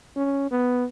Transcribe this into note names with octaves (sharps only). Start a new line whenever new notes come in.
C#4
B3